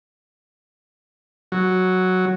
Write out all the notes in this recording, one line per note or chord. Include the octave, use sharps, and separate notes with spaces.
F#3